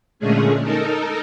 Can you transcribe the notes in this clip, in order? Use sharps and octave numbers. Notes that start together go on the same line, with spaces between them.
A#2 D3 G#3 A3 C#4 G#4
D#4 A4 A#4